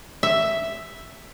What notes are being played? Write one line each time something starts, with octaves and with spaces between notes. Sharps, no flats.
E5